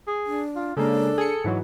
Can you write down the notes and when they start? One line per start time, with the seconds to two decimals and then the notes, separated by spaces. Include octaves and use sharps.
0.07 G#4
0.26 D4
0.56 F4
0.77 C#3 G#3 A#3 D4 A4
1.18 G#4 C#7
1.44 G#2 E3 F#3